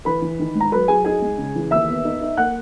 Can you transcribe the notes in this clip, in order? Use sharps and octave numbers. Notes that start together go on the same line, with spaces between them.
E3 B4 B5
E3
D#3
G#2
A#5
F#3 B4 B5
F#3 G#4 G#5
D#4 G#4 G#5
G#3
C#3
E3
D#2 E5 E6
B3
D#4
D#4
A#3 F#5 F#6